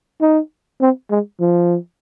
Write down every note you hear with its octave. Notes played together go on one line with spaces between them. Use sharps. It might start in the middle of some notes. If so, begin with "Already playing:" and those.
D#4
C4
G#3
F3